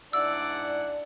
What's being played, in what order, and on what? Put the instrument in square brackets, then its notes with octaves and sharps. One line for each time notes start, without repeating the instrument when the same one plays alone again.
[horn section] G#2 E4 F#5 [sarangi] D4 [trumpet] D5 [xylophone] E6